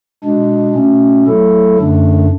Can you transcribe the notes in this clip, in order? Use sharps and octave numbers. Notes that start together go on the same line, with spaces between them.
B2 G#3 D4
B2 A3 C#4
F#3 A3 E4 A4
F#2 D3 A3 D4